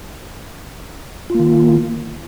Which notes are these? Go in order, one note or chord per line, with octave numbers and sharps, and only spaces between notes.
D#3 A#3 F4